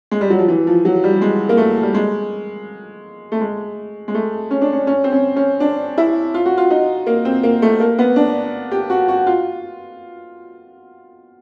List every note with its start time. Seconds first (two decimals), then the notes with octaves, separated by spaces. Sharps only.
0.11 G#3
0.21 G3
0.30 F#3
0.39 F3
0.48 E3
0.67 F3
0.85 F#3
1.04 G3
1.22 G#3
1.49 A#3
1.57 A3
1.83 G3
1.94 G#3
3.32 A3
3.41 G#3
4.08 G#3
4.14 A3
4.51 C#4
4.62 D4
4.73 C#4
4.87 C#4
5.04 C4
5.12 C#4
5.36 C#4
5.60 D4
5.98 E4
6.34 F4
6.46 F#4
6.58 F4
6.71 D#4
7.07 A#3
7.25 C4
7.43 A#3
7.62 A3
7.80 A#3
7.99 B3
8.16 D4
8.71 G4
8.90 F#4
9.08 F#4
9.26 F4